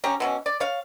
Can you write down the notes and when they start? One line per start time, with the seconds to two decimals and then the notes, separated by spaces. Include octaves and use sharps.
0.04 C#4 G4 A#5
0.20 B2 E3 C#4
0.46 D5
0.60 C#5 F5